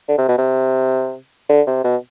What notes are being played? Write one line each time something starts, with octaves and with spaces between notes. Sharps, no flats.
D3
C3
B2
C3
D3
C3
B2